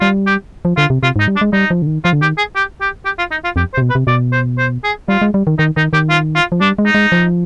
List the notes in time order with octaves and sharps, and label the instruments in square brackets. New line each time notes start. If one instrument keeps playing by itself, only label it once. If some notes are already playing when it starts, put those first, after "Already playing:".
[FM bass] G3 [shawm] F4
[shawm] G4
[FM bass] F3
[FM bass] D3 [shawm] F4
[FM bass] C3
[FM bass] C3 [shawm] F4
[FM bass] G#2
[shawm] D#4
[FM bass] G3
[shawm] D4
[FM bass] G#3
[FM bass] G3 [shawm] D#4
[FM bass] F3
D3
D#3
[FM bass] F3 [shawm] F4
[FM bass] D3
[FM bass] D#3 [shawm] G4
[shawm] G#4
G4
G4
G4
F4
D#4
F4
[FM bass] F2 [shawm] G4
[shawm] C5
[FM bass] C3
B2
[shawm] B4
[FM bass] C3
[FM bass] B2 [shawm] D5
[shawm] C5
C5
G#4
[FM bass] G3 [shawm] F4
[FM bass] G#3
G3
D#3
[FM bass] D#3 [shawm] D#4
[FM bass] D#3 [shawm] D#4
[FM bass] D#3 [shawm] G4
[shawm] F4
F4
[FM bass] F3
[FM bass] G3 [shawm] D4
[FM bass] G#3
[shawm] D#4
[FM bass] G#3
F3